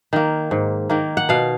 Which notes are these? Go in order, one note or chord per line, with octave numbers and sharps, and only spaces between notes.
D#3 A#3
G#2
D#3 A#3
F#5
B2 F5